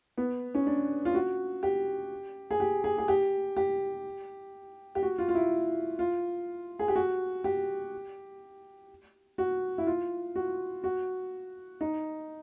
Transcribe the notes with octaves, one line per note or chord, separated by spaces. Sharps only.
B3
C#4
D4
F4
F#4
G4
G#4
G4
G#4
G#4
G4
G4
G4
F#4
F4
F4
E4
F4
G#4
G4
F#4
G4
F#4
E4
F4
F#4
F#4
D#4